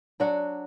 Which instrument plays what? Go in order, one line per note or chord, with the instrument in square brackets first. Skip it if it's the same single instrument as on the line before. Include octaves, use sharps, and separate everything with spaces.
[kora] F#3 D4 F#4